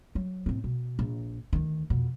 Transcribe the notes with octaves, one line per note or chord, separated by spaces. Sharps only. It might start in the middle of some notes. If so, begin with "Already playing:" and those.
F#3
A2 C4
B2
A#1
D2 D#3
F2 B2